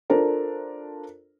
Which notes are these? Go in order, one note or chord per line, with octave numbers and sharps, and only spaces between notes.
D4 F4 A4 A#4 C5